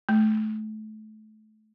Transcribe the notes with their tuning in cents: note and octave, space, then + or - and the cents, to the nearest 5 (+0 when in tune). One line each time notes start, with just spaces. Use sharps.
A3 -30